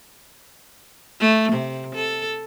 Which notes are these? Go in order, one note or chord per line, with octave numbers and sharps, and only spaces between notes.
A3
C3
A4